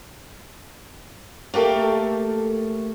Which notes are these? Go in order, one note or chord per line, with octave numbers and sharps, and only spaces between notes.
A3 A#3 G4 A4 E5